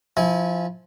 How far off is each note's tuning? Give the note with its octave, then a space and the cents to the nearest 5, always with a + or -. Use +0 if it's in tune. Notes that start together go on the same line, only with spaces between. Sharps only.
F3 +0 E4 -25 G#5 +0